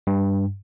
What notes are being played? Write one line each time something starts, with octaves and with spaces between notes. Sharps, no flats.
G2